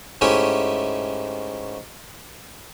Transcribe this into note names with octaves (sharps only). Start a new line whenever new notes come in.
G#2 A3 C#4 E4 G4